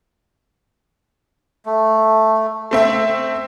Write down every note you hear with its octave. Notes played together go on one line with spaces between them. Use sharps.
A3
A3 C4 E5